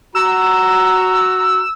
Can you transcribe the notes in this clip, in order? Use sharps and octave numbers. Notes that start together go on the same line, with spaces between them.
F#4 A#5 E6